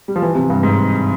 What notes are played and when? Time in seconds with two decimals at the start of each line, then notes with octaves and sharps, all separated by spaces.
0.08 G3
0.16 F3
0.22 E3
0.35 C3
0.50 G2
0.63 G#2